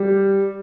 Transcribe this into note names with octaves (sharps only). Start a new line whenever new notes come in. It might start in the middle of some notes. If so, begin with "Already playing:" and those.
Already playing: G3